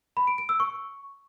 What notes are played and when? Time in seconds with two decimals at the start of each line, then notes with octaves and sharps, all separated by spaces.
0.17 B5
0.27 D7
0.38 D7
0.49 E6
0.60 C#6